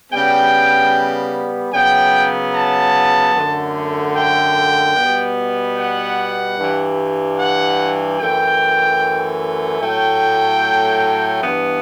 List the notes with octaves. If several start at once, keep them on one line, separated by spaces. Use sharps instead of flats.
C#3 G3 B3 G5
C#3 F#3 B3 G5
A5
F#2 D3 A3
G5
B2 G3 B3
F#5
G2 E3 G3
F#5
F#2 E3 A3 G5
A2 F#3 A3 G5
G2 E3 B3